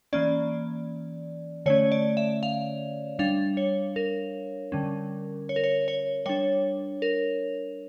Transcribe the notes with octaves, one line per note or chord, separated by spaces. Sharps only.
E3 A#3 C#4 D5
D3 A3 C#4 C#5
D5
E5
F5
G3 D4 F5
C#5
A#4
D3 G3 C#4
C#5
A#4
C#5
C#5
G3 D4 C#5
A#4